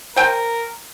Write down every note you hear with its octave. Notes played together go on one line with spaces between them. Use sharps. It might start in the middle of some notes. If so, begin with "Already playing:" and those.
A#4 C5 G5 G#5